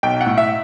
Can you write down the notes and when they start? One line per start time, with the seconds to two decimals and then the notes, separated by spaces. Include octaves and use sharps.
0.03 B1 G5
0.21 F#5
0.26 A2
0.38 E5